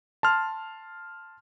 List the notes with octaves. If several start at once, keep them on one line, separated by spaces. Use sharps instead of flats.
A5 C6 F6